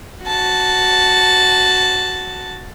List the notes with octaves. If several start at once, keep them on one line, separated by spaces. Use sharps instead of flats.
F#4 A5